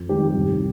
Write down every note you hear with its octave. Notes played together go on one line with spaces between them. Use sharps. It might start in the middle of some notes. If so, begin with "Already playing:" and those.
Already playing: F2
D#3 G3 G4
C2